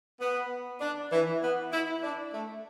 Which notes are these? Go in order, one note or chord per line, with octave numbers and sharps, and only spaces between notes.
B3
D4
E3
B3
E4
D4
A3